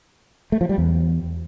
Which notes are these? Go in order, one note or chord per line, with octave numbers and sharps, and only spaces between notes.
A3
F3
G3
E2